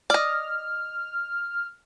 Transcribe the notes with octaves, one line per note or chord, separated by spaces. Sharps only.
D5 D#5 F6